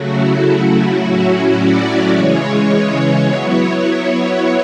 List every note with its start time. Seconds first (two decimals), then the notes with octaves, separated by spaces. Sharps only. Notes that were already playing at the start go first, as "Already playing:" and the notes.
Already playing: C#3 F#3 A3 F#4
0.14 E4
0.99 A2 F#3 C#4 E4 F#4
1.28 F#4
1.55 D5
2.12 C#3 E3 G#3 C#5
3.25 F#3 B3 E4 C#5